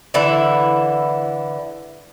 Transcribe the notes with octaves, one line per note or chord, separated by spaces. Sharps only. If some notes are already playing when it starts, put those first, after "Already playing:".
D3 E3 E4